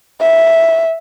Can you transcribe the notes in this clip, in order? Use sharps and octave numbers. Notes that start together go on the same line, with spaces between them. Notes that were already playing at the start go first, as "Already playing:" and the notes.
E5